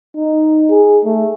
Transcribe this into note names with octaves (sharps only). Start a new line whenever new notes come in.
D#4
G#4
A3